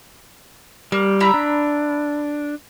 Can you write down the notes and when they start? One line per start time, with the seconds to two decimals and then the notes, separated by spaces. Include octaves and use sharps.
0.92 G3 A#3
1.20 E4 A#5 B5
1.34 D4